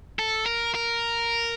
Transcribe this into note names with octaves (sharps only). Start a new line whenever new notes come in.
A4
A#4
A#4